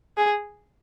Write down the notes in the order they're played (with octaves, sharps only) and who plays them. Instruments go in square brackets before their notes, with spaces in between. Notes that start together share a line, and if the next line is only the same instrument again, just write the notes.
[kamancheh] G#4